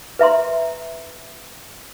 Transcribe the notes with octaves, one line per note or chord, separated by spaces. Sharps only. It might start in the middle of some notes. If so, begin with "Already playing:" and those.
B4 E5 A#5 C6